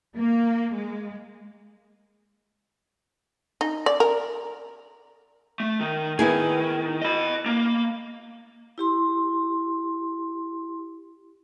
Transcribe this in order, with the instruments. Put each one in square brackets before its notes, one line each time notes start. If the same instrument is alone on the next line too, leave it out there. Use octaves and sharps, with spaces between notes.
[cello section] A#3
G#3
[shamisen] D#4
D5
A#4
[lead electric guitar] A3
D#3
[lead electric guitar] D#3 [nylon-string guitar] B3 E4 G#4
[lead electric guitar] D#5 B5
A#3
[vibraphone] E4 G4 C6